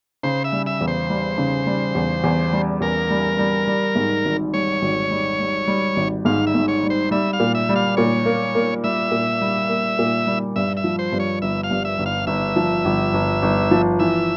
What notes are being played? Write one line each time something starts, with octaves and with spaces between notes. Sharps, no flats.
C#3 C5
E5
G3
E5
E2
C5
G3
C#3
G3
E2
E2
G3
E2 A#4
G3
G3
G3
G#2
G#1
G3 C#5
G#1
G3
G3
G3
G#1
G#2 F5
E5
G#2
C#5
G3
C5
G3 E5
F5
A#2
E5
G3
F5
A#2 C#5
A#3
A#3
G3 E5
A#2
G3
A#3
A#2
G3
G2 E5
E5
F3
C5
G2
C#5
G1 E5
F5
G2
E5
G1
F5
G1 E5
F3
G1
G1
G1
F3
E3 E5